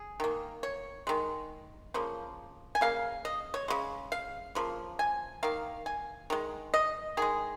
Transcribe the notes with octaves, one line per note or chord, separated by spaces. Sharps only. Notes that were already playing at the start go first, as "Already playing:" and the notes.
Already playing: G#4
D#3 A#3
C#5
D#3 G#3
C#3 F3 A#3
G#5
C#3 A#3 F5
D#5
C#5
C#3 G#3
F5
C#3 F3 A#3
G#5
D#3 A#3 F5
G#5
D#3 G#3
D#5
D#3 G#3 G#4